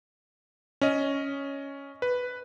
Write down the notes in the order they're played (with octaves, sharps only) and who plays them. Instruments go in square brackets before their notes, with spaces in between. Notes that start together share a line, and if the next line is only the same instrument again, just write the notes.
[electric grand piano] C#4 D#5
B4